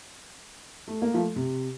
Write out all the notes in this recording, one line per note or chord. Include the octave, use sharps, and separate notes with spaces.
A3
A#3
F3 A3
C3